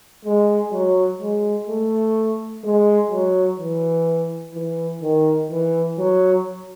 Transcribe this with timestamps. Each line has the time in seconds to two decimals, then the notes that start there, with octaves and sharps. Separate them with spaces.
0.25 G#3
0.72 F#3
1.20 G#3
1.68 A3
2.64 G#3
3.11 F#3
3.59 E3
4.54 E3
5.02 D#3
5.51 E3
5.98 F#3